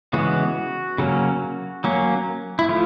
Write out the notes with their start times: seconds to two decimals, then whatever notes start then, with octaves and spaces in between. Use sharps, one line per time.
0.13 C#3 E3 G#3 B3 F#4
0.98 C#3 F#3 A#3 C#4
1.84 F#3 A#3 C#4
2.59 E4
2.69 F3 A3 F4